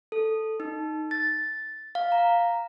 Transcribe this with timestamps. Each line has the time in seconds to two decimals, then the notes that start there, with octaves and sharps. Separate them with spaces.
0.12 A4
0.60 D#4
1.11 A6
1.95 F5
2.12 A#5